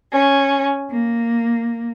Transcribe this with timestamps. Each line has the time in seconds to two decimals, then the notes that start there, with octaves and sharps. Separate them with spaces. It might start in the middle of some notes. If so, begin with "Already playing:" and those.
0.12 C#4
0.90 A#3